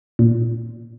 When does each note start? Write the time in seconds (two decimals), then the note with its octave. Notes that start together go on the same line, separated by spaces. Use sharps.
0.19 A#2